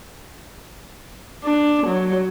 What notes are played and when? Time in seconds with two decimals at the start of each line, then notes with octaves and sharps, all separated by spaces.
1.44 D4
1.87 F#3